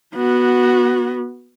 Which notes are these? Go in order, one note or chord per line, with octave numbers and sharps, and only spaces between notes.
B3 F#4